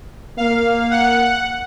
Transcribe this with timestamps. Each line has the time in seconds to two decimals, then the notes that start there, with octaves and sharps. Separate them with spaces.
0.37 A#3 F5
0.91 F#5